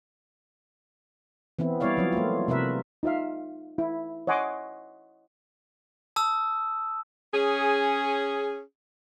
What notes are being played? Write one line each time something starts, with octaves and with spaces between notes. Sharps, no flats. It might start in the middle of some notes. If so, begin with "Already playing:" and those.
E3 B3 C4 E4
G3 B3 E4 C#5 D5 F5
F3 F#3 C4
A3 A#3 F4
C3 A#4 B4 E5
D#4 F4 E5 F5
E4
C#5 D#5 F#5 G#5 C6 D6
A5 D#6 E6
C#4 G#4